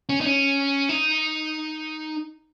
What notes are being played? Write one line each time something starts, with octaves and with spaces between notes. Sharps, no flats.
C#4
D#4
C#4
D#4